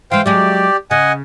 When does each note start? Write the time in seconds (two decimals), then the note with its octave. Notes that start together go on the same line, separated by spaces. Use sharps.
0.11 E3 G#3 C5 F5 G5
0.26 F#3 G#3 G4 D5
0.91 C#3 D#5 F#5 G#5